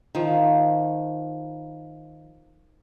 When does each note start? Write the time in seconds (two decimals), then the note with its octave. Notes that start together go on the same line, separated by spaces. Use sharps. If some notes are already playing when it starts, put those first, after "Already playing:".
0.15 D#3 F3